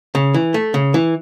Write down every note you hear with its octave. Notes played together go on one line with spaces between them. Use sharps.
C#3
E3
A3
C#3
E3